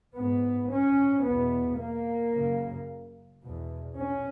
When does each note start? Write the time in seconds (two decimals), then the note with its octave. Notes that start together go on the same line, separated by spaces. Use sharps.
0.16 G#2 B3
0.71 C#4
1.25 E2 B2 B3
1.80 A#3
2.34 F#2 C#3
3.42 E2 B2
3.97 C#4